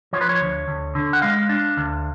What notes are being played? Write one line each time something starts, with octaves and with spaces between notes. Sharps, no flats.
F3 C#5
B4
C#5
D2
D2
D3
F#5
G#3 F5
D4
D2